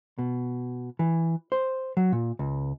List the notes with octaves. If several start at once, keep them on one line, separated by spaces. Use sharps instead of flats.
B2
E3
C5
F#3
A#2
C#2